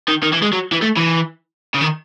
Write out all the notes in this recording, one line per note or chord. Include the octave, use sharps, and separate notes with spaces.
D#3
D#3
E3
G#3
F#3
E3
A3
E3
C#3
D#3